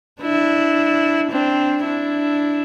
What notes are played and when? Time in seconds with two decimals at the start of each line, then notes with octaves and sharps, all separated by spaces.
0.21 D4 E4
1.31 C4 D4
1.85 D4 E4